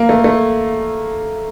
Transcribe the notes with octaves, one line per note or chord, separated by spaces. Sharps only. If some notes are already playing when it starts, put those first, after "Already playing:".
Already playing: A#3
A3
A3